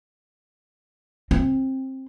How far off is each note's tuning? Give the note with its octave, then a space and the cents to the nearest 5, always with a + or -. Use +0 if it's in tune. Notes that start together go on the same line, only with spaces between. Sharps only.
C4 +20